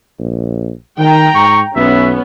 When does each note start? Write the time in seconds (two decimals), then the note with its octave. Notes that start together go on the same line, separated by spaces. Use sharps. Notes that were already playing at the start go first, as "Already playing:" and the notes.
0.19 A#1
0.99 D#3 G5 A#5
1.35 G#2 C#6
1.76 B1 B3 C#4 E5